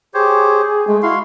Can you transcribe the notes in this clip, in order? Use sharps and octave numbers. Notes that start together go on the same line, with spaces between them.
G4 G#4 C5 C#5
G#3 A3
E4 F#4 F5 C6